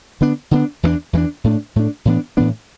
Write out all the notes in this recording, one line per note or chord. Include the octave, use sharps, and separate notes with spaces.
D3 B3 D4
D3 B3 D4
E2 E3 A3 D4
E2 E3 A3 D4
A2 A3 D4
A2 A3 D4
A2 E3 B3 D4
A2 E3 B3 D4